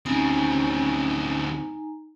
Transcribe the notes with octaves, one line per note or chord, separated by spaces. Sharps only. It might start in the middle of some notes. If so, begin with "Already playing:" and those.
D2 C4 C#4 D#4 G#5 A#5